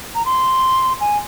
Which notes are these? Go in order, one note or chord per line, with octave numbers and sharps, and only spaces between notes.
A#5
C6
G#5